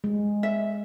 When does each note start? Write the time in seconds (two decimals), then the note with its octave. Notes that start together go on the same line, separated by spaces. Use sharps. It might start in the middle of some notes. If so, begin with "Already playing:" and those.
0.04 G#3
0.43 E5